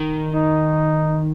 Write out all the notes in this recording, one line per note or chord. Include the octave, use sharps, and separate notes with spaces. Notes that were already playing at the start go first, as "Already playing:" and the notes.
Already playing: D#3
D#4